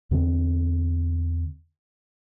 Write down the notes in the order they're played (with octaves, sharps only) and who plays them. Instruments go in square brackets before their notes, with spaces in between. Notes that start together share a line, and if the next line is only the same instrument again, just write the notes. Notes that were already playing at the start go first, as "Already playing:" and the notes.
[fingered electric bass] E2 D3 B3 C4